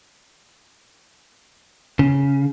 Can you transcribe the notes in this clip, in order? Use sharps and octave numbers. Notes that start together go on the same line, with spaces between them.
C#3